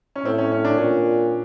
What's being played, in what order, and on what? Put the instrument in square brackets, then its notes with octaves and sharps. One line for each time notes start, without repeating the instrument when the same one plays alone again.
[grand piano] C#4
[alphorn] A2 [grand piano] C4
[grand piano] C#4
C#4
D4
[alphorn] A#2 [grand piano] C#4